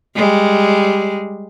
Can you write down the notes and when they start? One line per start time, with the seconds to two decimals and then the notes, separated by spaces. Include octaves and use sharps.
0.15 G3 G#3